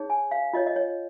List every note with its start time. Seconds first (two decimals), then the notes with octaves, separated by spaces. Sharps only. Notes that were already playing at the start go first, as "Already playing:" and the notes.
Already playing: D#4 G#4 C#5
0.10 G#5
0.31 F5
0.53 F4 C#5 D#5
0.66 D#5
0.76 C#5